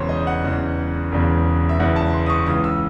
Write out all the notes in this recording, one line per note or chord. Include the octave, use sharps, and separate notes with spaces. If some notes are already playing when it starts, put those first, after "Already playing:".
Already playing: E1 E2 C#3 C5 C#5
D#5
F#5
E1 E2 C#3
E1 E2 C#3
E5
E1 E2 C#3 F#5
A5
C6
D#6
C#6
C#2 C#3 E3 D#6
E6